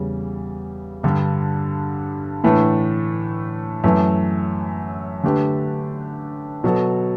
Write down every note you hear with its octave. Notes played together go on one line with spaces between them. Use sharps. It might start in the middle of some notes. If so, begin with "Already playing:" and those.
Already playing: E2 C#3 G3
G2 D3 G3 D4 G4
A2 E3 A3 D4
F#2 E3 A3
D3 A3 D4 G4 B4
B2 F#3 B3 F#4 A4